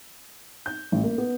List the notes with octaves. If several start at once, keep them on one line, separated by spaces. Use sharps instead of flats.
G6
A1
A#3
B3